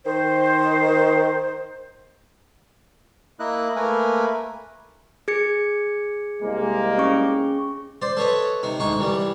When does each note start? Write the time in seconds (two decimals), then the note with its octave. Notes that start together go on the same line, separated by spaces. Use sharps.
0.06 D#3 C5
3.40 A#3 E4 D#5 F#6
3.76 A3 A#3 A#4 B4 G#5
5.28 G#4 G#6 C#7
6.42 C2 G#3 A#3
6.98 C#4 G#4 C#6
8.02 C5 D5
8.17 A4 B4 C#5 D#5
8.63 C3 D#4
8.80 D2 G#2 D#4 C#6
8.99 C2 E3 G3